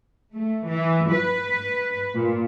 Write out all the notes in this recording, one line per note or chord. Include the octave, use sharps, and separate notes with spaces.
A3
E3
B4
A#2